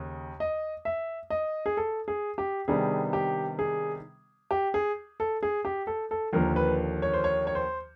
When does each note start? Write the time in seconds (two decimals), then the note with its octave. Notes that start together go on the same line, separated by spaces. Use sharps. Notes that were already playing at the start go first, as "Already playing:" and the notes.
Already playing: D#2 C#3
0.40 D#5
0.85 E5
1.30 D#5
1.66 G#4
1.77 A4
2.08 G#4
2.38 G4
2.68 C3 D#3 G3 B3 D4 G#4
3.13 G4
3.59 G#4
4.51 G4
4.74 G#4
5.20 A4
5.43 G#4
5.65 G4
5.87 A4
6.11 A4
6.33 D#2 D3 F3 A#3 A#4
6.56 B4
7.02 C#5
7.14 C5
7.24 C#5
7.47 C#5
7.55 C5